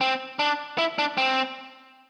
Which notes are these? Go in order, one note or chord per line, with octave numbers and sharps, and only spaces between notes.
C4
D4
E4
D4
C4